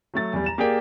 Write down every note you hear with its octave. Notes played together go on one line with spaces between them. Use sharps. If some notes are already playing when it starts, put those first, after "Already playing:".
F#3 A3 A6
E2 G3
A#5 E7
A#3 G4 G#4 A#4 D5 G5